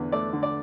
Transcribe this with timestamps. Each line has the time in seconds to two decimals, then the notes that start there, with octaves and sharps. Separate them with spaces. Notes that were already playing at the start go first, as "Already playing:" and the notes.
Already playing: E2 D3 B4
0.12 A3 D5
0.33 D3
0.43 D5